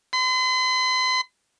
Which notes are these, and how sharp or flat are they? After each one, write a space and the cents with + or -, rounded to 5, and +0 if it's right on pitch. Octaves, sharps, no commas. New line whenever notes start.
C6 -45